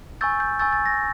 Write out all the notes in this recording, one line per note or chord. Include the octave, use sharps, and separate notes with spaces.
G#5 C#6 E6 G6 A6
G6
G#5 C#6 E6 G6 A6
A6
A#6